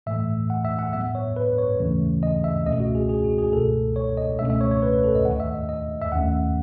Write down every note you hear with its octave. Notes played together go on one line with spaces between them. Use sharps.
A2 E3 A3 E5
F#5
E5
F#5
A2 F#3 B3 E5
C#5
B4
C#5
D#2 C#3 E3 A3 C#4
D#5
E5
C#2 B2 A3 C#4 D#5
F#4
G#4
G#4
F#4
G#4
C#2 B2 A3 A4
C#5
D#5
C#2 B2 A3 C#4 E5
E5
C#5
C#5
B4
B4
A4
D#5
D#2 D#3 A3 F#5
E5
D#5
D#5
E5
D#2 D#3 A3 C#4 F#5